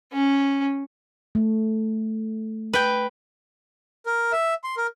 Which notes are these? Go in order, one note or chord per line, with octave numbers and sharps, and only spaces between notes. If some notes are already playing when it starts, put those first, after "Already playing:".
C#4
A3
B4 G5
A#4
E5
C6
A#4